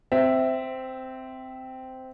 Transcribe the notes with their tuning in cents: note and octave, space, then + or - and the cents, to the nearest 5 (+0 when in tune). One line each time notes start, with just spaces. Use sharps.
C4 -10 E5 +0